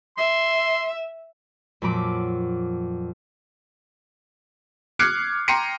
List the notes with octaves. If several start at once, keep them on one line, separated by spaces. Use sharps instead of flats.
E5 C6
F2 A#2 F#3 B5 D6
D6 F6 F#6 G#6 C7 C#7
G5 A#5 C6 C7 C#7 D#7